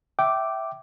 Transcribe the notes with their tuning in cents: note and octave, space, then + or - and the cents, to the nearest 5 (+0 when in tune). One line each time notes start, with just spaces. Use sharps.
E5 +0 G5 -25 D6 +0